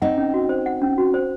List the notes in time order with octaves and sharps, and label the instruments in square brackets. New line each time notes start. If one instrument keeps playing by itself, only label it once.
[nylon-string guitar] C4 D#4 [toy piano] F#5
[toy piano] C#4
F#4
C5
F#5
C#4
F#4
C5